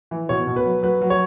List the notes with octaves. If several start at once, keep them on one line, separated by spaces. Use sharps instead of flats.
E3
B2 C#5
B2
B4
F#3
F#3 B4
F#3
C#5